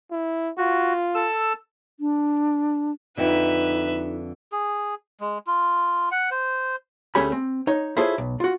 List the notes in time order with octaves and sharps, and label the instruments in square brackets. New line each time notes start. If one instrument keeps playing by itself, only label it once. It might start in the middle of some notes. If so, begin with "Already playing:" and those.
[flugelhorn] E4
[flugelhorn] F4 [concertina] F#4
[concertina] A4 E6
[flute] D4
[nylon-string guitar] F2 D3 [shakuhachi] D#4 [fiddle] B4 E5
[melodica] G#4
G#3
F4
F#5
C5
[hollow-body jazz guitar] D2 A3 C#4 G4 G#4 B5
C4
D#4 C#5
E4 F4 G#4 A4 C5 C#5
B1
F4 F#4